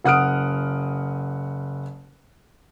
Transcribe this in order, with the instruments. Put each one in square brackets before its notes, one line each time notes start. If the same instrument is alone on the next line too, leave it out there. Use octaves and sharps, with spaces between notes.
[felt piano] F#1 F#5 D#6 F6 D7